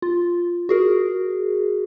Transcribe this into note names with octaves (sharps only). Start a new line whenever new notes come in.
F4
F#4 G#4 A#4